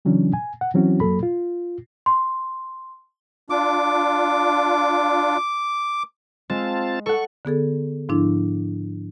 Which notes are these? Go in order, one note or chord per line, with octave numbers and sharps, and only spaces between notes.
C#3 E3 F#3 C#4 D4
G#5
F#5
E3 F#3 C4 C#4 E4 F#4
F#2 F#3 A#3 A4 B5
F4
C6
D4 F4 D6
G#3 C4 F4 A5
A4 F#5 C#6
D3 B3 G#4 A4
G#2 F3 D4 E4